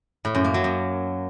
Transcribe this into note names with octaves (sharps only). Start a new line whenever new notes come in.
A2
F#2
A#3
F#3
F#2